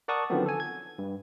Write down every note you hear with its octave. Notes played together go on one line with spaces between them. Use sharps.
A#4 D5 F#5 A5 C#6 D#6
D3 D#3 F3 F#3 B3 C4
A4 G#5
G#6
G2